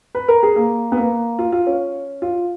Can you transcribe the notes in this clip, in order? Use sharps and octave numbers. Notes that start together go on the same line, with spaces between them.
B4
A#4
G#4
A#3
B3
A#3
F4
F4
C#4
F4